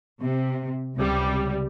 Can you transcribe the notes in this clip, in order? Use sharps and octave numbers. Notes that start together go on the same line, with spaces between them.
C3
C#2 C3 G3